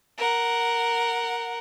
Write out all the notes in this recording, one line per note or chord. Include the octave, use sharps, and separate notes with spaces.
A#4 F#5